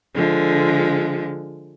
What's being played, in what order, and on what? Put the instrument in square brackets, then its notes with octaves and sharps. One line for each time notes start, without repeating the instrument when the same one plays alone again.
[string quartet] D3 F3 G#3